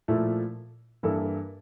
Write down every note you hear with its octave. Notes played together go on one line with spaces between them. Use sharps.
A#2 F3 A3 E4
G2 E3 A#3 E4 A4